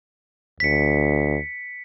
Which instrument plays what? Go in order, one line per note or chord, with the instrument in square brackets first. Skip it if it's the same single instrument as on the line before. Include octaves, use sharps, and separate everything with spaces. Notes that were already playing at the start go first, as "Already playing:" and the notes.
[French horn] D2 [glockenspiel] B6 C#7